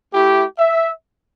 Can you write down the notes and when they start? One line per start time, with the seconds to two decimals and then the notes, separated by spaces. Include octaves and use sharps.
0.13 A3 E4 G4
0.58 E5